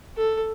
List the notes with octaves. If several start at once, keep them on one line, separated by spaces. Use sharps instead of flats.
A4